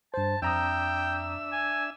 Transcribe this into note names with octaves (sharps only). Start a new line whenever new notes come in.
G2 C5 A5
F2 D4 E5 G5 A#5 D#6 E6
G#5